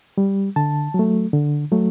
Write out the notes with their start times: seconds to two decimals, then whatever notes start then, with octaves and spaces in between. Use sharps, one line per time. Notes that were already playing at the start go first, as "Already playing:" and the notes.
0.18 G3
0.56 D3 A5
0.94 F#3 A3
1.33 D3
1.72 F#3 A3